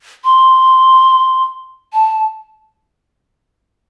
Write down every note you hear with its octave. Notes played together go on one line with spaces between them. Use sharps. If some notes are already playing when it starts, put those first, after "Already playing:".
C6
A5